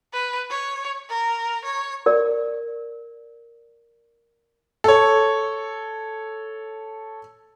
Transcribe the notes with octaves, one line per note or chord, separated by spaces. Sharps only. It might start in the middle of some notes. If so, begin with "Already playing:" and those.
B4
C#5
A#4
C#5
A#4 D5
A4 C#5